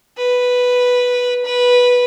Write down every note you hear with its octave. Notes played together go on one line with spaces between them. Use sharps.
B4
B4